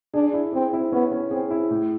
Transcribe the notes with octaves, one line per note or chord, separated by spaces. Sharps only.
D4 G#4
E4
C4 G#4
E4
B3 C#4
C#4
C4 G#4
E4
A2